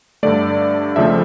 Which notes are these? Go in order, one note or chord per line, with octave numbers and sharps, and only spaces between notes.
G2 D3 A3 D5
F2 C#3 F3 A3 E5